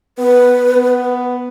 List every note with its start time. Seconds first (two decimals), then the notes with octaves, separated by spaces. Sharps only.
0.18 B3 B4
0.77 B3